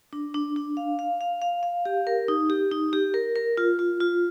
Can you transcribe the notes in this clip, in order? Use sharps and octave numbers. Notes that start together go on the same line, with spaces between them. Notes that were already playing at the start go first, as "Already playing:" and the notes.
D4
D4
D4
F5
F5
F5
F5
F5
G4
A#4
D#4
G4
D#4
G4
A#4
A#4
F4
F4
F4